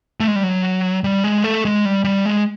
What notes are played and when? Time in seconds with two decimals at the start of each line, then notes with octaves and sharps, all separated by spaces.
0.20 A3
0.28 G#3
0.36 G3
0.43 F#3
1.04 G3
1.24 G#3
1.44 A3
1.65 G#3
1.85 G3
2.04 G3
2.25 G#3